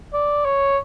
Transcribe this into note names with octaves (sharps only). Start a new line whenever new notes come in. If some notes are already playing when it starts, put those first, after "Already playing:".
D5
C#5